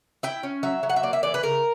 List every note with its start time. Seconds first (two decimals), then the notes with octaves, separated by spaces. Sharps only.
0.23 E4 G5
0.43 C#4
0.63 F#3 E5
0.83 F#3
0.90 F#5
0.96 E5
1.03 A#3 D5
1.13 E5
1.23 E3 D5
1.34 B4
1.43 C#3 A#4